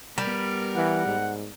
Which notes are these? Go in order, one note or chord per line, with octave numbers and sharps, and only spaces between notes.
G3 B3 A#4
E3 F#5
G#2